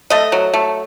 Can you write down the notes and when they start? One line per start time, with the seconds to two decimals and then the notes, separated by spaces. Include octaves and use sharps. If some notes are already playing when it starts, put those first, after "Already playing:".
0.10 A3 D#5
0.32 F#3
0.54 A3